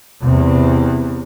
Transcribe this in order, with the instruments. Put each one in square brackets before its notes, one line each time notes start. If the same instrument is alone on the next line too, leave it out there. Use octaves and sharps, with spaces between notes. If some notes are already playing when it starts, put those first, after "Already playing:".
[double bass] E2 C3